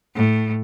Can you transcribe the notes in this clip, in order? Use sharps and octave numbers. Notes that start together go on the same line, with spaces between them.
A2